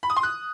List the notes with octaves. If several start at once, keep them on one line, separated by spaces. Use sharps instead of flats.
B5
D#6
C6
F#6